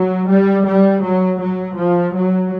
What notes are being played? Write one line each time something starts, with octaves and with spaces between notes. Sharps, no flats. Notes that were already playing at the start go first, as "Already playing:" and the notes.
Already playing: F#3
G3
G3
F#3
F#3
F3
F#3